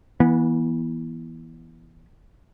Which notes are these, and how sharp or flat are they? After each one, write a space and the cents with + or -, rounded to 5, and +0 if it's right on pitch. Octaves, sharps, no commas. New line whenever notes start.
E3 -5 B3 -35